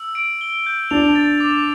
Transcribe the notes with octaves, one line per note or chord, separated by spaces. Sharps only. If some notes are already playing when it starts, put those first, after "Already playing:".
Already playing: E6
D7
G7
G6
D4 F7
A6
D6